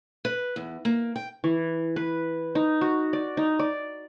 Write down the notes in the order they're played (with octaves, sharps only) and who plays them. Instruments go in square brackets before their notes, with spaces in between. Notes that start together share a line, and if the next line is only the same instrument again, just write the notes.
[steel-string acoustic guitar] B4
E2
A#3
G5
[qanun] E3
B4
D#4
F#4
D5
D#4
D5